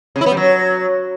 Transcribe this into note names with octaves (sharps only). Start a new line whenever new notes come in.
C#3
E4
B3
G3
F#3